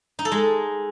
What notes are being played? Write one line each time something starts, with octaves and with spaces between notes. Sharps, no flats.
D#4
A4
G#3